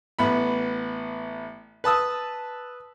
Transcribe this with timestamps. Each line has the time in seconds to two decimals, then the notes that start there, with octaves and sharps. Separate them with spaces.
0.19 A1 B3 B5
1.84 B4 A5 D#6 E6